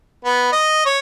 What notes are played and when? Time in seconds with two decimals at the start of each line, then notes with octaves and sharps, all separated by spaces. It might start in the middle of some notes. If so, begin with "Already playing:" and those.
0.25 B3
0.52 D#5
0.86 C#5